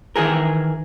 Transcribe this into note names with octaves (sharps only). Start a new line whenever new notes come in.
D#3 E3 G#4 A#4